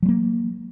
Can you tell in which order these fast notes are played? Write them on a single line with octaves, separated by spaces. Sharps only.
F#3 G#3 A#3